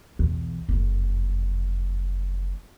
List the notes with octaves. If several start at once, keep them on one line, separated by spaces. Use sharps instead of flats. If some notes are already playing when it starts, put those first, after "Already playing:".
B1 E2
F#1 F2